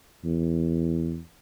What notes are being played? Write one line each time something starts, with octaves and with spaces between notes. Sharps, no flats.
E2